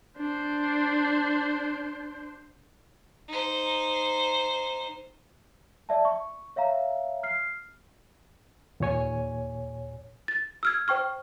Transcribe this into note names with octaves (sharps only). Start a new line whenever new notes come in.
D4 C5
D#4 C5
D5 E5 A5
C#6
C#5 E5 F5 A#5
F6 C7
D#2 A#2 C#5 G#5
A6
E6 F6 G#6
C5 G5 C#6 F6